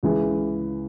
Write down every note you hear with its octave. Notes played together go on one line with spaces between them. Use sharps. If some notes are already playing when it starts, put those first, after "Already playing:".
C#2 C#3 E3